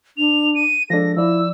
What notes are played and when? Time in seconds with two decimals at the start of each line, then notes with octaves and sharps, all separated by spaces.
0.17 D4 F7
0.55 D#7
0.90 F3 G#3 D4 A4 A#6
1.16 F3 E4 D5 E6